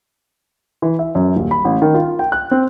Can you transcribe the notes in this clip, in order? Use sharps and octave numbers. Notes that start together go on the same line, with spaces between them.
E3
E5
F#2
D#1
B5
A1
D#3
F4
G5
F#6
C4